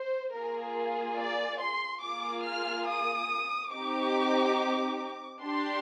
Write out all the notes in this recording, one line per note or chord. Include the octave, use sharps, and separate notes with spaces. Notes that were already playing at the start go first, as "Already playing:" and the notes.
Already playing: C5
A#3 F4 G#4 A#4
D5
C6
A#3 F4 G#4 D6
F6
D#6
C4 D#4 G4 D6
D4 G4 C6